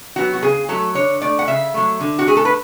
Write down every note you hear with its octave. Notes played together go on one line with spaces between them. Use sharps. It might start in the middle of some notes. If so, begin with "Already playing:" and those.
F#3 B3 F#4
F#4
C#3 G#4
F#3 A3 A4
D3 C#5
A3 D5
F#5
C#3 E5
F#3 A3
D3
F#4
A3 G#4
A4
B4